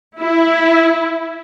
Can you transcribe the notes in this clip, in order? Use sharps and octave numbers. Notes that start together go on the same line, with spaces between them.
E4